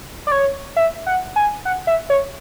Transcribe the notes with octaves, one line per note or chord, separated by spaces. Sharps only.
D5
C#5
E5
F#5
G#5
F#5
E5
C#5